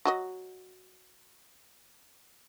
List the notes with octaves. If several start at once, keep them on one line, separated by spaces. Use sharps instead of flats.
F#3 F#4 D#5